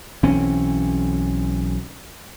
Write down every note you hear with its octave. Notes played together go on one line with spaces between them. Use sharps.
B1 E3 C4 C#4